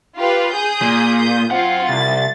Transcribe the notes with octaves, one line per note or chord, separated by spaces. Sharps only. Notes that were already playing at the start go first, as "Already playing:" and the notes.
F4 G4 B4
G#4 D#6 G6
A#2
D#6 G6
F#2 C4 F4 F#5
C2 A6